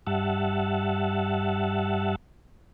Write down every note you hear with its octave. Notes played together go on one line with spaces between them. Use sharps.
G2 G3 E5 F#5 A5